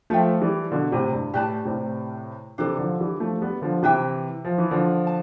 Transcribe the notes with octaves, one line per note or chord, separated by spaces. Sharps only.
F3 A3 A4 C5 E5 G5
E3 G3
B2 D3
A2 C3
G2
A2 G4 B4 D5 A5
A2 C3
C3 E3 D4 A4 D5
D3 F3
E3 G3
F3 A3
G3 B3
D3 F3
C3 E3 B4 E5 G5
F3
E3
D3 F3
A5